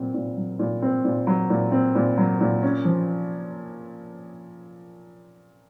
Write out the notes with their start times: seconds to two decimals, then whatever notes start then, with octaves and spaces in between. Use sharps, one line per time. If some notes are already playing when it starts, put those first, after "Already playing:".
Already playing: A#2 F#3 C4
0.14 A#2
0.37 F#3
0.59 A#2
0.82 C4
1.05 A#2
1.27 F#3
1.50 A#2
1.72 C4
1.95 A#2
2.18 F#3
2.41 A#2
2.63 C#4
2.85 F3